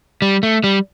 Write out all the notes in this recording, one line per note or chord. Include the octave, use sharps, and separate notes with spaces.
G3
A3
G3